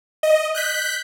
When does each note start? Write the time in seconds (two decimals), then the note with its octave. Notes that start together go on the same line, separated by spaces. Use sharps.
0.23 D#5
0.55 F#6 G6 B6